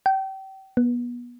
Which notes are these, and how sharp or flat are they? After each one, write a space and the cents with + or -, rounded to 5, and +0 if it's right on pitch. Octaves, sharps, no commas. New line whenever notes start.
G5 -30
B3 -30